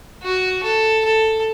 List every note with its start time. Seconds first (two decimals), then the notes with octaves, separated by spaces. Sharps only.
0.23 F#4
0.64 A4
1.05 A4